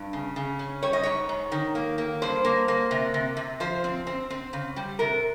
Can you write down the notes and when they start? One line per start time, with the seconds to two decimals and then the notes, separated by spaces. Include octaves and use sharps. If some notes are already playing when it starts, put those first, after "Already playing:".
Already playing: G2
0.13 C#3
0.36 C#3
0.59 C#4
0.83 G3 C#5
0.93 D#5
1.03 G#2 C#5
1.29 G#2
1.52 D#3
1.75 A#3
1.98 A#3
2.22 G2 C5
2.45 A#3
2.68 A#3
2.91 C3
3.14 C3
3.37 C3
3.60 F3 C5
3.84 C4
4.07 C4
4.30 C4
4.53 C#3
4.76 G3
4.99 C3 A#4